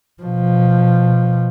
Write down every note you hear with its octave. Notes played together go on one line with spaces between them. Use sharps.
B2 F3